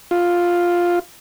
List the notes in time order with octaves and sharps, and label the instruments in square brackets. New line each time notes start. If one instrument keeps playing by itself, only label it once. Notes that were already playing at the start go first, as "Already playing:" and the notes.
[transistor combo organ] F4